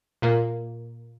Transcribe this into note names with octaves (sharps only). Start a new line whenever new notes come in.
A#2 A#3